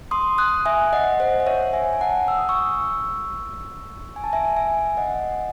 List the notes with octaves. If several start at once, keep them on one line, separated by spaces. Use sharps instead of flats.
C6 D#6
D#6 F#6
E5 G#5
D#5 F#5
C5 D#5
F#5
C#5 E5
E5 G#5
G#5
F#5 A5
E6
D#6
C#6 E6
G#5
A5
E5 G#5
E5 G#5
D#5 F#5